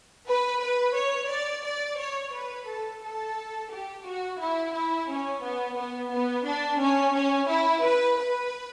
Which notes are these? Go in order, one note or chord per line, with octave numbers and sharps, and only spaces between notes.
B4
B4
C#5
D5
D5
C#5
B4
A4
A4
G4
F#4
E4
E4
C#4
B3
B3
B3
D4
C#4
C#4
E4
B4
B4